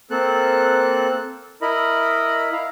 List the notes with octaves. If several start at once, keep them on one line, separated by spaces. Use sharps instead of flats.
A#3 C4 A4 F#6
E4 A#4 D#5 B5
E4 F5 A#5